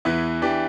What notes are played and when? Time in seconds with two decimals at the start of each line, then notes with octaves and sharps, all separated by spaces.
0.05 E2 E3 B3 E4
0.42 E3 D4 G4